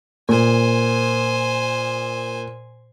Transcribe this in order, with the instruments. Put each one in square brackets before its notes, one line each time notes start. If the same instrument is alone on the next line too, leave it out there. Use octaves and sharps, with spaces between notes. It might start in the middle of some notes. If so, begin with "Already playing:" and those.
[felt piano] A#2 [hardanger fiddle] C5 G#5